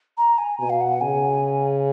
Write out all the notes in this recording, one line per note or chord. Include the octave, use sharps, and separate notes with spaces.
A#5
G#5
B2 G#5
F5
F#5
C#3 G#5